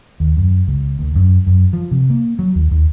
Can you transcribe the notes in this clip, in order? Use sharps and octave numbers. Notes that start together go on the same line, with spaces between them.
D#2
F#2
C#2
D2
F#2
F#2
F3
C3
A#3
F#3
D#2
D#2